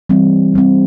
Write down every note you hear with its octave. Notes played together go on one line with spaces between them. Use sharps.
E3 G3 C4
E3 G3 C4